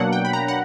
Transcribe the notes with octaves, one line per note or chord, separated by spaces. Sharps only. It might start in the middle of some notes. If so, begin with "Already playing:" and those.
Already playing: B2 F#3 A#3 D4 F#5
G5
B5
A#5
F#5